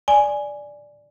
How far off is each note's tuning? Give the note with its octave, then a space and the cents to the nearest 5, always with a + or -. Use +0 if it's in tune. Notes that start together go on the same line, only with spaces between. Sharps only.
D5 +0 G#5 +0